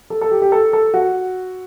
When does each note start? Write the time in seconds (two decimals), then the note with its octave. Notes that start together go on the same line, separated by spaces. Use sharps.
0.10 A4
0.21 A4
0.31 G4
0.42 G4
0.52 A4
0.73 A4
0.94 F#4